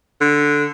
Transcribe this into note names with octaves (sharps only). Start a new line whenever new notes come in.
D3